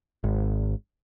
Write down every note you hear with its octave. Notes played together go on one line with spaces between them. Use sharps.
G#1